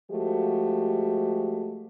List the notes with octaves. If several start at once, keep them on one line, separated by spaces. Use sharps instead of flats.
F3 G#3 A3 F#4 G4